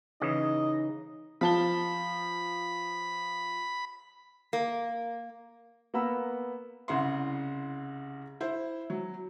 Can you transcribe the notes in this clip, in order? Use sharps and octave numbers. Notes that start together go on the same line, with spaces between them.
C#3 E3 D#4 D#5
F3 A5 B5 G7
A#3
A#3 B3 F#5 A#5 B5 E6
C2 C#3 E4 F#5 C6
E4 C5
F#3